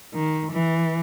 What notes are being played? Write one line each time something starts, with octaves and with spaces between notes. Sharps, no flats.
D#3
E3